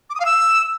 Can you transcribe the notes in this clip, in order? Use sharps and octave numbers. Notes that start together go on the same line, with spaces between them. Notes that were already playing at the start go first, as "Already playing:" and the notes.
D6
D#6
F5
E6